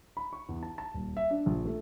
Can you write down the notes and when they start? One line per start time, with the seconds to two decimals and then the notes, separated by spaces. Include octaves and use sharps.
0.17 B5
0.33 C#6
0.49 E2
0.63 A5
0.78 A5
0.94 D#1
1.17 E5
1.31 D4
1.46 A#1
1.65 A3